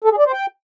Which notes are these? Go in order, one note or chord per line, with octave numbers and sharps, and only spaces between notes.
A4
G#4
D5
C5
G5